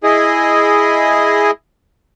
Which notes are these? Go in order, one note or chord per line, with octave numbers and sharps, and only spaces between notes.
E4 G#4 D#5